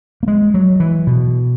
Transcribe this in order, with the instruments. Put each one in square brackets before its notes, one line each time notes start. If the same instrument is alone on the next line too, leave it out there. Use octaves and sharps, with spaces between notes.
[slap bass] A#3
G#3
F#3
E3
B2